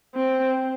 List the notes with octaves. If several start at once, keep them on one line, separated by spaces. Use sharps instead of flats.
C4